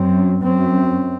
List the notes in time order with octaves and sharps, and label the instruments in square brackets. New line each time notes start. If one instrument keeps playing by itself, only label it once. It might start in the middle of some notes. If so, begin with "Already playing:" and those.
Already playing: [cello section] F#2 [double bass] C4
[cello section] F#2 [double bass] C4